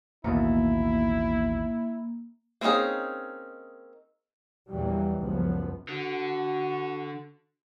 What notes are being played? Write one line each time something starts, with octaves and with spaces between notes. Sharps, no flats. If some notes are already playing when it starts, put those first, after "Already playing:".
A1 D#2 B2 A#3 E4
A#3 C4 C#4 D#4 G#4
A#1 E2 A#2 E3 F#3 G3
F#1 C#2 F#2 F3 B3
D3 F#4